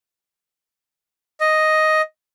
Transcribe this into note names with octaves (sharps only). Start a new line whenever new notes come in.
D#5